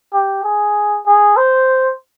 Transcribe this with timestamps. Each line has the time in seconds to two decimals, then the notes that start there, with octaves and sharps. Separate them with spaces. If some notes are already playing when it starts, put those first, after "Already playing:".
0.13 G4
0.44 G#4
1.06 G#4
1.37 C5